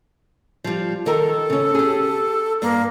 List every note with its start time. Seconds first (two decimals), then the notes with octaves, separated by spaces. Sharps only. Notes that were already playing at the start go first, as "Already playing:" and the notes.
0.64 F3 G3
1.06 D#3 A4 A#4
1.50 C#3 C#4
1.75 G4 G#4
2.62 G2 A#3